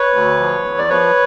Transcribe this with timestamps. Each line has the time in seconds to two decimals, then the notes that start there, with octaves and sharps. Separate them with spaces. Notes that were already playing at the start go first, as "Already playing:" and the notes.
Already playing: B4 C#5
0.14 D2
0.39 F3
0.64 E2
0.78 D5
0.89 F3 B4 C#5